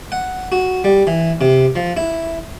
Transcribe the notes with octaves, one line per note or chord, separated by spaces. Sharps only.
F#5
F#4
G3
E3
C3
F3
E4